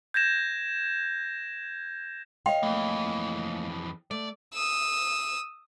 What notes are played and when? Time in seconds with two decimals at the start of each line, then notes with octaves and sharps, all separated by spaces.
0.14 G6 G#6 A#6 E7
2.46 C#5 D#5 F5 G5
2.63 F2 E3 A3 A#3
4.11 A3 D5
4.53 D#6 E6